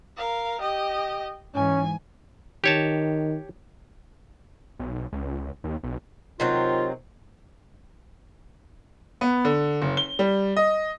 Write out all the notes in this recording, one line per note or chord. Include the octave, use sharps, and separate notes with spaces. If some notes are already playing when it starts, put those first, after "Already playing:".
A#4 F5
G4 D#5
G#2 E3 C#4 G#5
D#3 G4 C#5 A5
B1
C#2
D#2
B1
C3 D#3 F#3 C4 F4
B3
D3
F#1
G7
G3
D#5